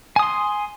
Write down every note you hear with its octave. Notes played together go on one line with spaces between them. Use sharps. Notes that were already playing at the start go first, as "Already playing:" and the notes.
G#5 C6 D#6